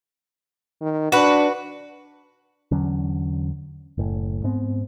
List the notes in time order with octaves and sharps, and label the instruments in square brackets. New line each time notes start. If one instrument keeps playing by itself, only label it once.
[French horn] D#3
[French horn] D4 [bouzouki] F#4 B4
[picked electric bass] E2 D3 F#3 C#4
F#1 A2
G#2 B3 C4